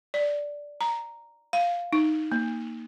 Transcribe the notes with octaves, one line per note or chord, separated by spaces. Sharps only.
D5
A#5
F5
D#4
A#3